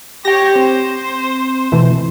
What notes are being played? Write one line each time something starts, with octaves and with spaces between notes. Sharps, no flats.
G4 C#5 G5 A#6
C4 C5
B2 E3 A3